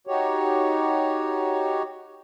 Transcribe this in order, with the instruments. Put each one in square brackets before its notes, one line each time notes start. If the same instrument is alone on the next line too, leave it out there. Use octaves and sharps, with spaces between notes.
[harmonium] D#4 F#4 G4 C#5